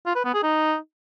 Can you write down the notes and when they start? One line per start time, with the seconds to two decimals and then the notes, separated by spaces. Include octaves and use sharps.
0.06 F4
0.15 B4
0.25 B3
0.34 G#4
0.43 D#4